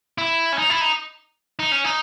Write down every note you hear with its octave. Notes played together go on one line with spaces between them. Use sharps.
E4
C#4
D#4
E4
D#4
D#4
C#4
D#4